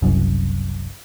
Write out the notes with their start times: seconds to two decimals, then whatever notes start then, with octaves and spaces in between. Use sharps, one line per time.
0.02 F#1 C2 F#2